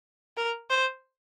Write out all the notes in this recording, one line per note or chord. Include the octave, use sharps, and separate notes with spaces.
A#4
C5